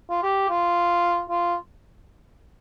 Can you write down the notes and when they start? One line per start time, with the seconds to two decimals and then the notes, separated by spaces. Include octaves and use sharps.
0.10 F4
0.23 G4
0.50 F4
1.30 F4